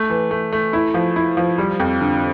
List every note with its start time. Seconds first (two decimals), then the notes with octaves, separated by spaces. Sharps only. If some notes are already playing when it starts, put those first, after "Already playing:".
Already playing: A3
0.10 E3
0.31 A3
0.53 A3
0.73 E4
0.94 F3
1.16 E4
1.37 F3
1.58 G3
1.80 F2
2.01 D3